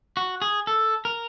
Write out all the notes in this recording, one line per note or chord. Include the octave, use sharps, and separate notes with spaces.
F#4
G#4
A4
A#4